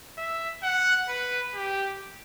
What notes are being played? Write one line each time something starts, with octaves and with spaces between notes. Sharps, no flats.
E5
F#5
B4
G4